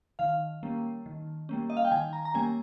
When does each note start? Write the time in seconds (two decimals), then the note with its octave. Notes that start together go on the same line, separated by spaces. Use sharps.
0.19 D#3 F5
0.63 G3 A#3 C#4
1.06 D#3
1.49 G3 A#3 C#4
1.70 D#5
1.77 F5
1.85 G5
1.92 D#3 G#5
2.13 A#5
2.25 A#5
2.34 G3 A#3 C#4 G#5